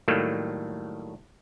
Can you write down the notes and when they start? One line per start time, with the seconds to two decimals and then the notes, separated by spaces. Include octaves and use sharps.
0.08 A2 D#3 F#3 G3 A3 A#3